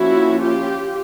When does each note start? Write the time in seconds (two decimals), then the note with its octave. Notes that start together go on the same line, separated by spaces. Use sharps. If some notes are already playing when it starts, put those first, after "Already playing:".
Already playing: F3 A#3 C#4 E4 F#4
0.41 F4 G4